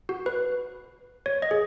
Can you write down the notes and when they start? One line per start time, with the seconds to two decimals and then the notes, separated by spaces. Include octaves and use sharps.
0.09 F#4
0.26 B4
1.26 C#5
1.42 D#5
1.51 G#4